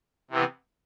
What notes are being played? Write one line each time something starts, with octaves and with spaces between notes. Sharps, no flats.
C3 E3 B3